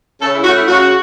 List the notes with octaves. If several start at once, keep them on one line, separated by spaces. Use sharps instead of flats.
C#3 A4
E4
A3 C#4 F#4
E4
C#3 F#4